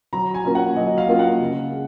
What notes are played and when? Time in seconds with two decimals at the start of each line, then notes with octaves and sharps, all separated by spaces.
0.13 F#3 A#5
0.34 G#5
0.45 A#3 C#4 F4
0.55 F#5
0.76 F#3 D#5
0.98 F5
1.08 A#3 C#4 F4
1.19 F#5
1.40 C#3
1.72 G#3